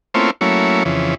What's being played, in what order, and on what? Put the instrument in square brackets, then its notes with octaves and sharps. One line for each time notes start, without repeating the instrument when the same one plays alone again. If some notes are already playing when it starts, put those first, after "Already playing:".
[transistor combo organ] A3 A#3 C4 C#4 E4 F4
F#3 A3 A#3 C#4 E4
F2 C#3 E3